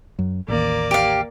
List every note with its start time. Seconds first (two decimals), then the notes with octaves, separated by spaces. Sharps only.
0.19 F#2
0.48 A1 D#2 A#3 D5
0.91 G4 F5